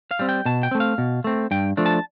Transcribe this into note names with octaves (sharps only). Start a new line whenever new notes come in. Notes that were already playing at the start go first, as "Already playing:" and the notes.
F5
G3 C4
G5
B2 A5
G5
A3 C4
F5
B2
A3 C4
G2 G5
F3 A3 D4
A5